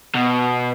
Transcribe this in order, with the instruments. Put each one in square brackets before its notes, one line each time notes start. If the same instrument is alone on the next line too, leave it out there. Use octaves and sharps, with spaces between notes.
[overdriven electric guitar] B2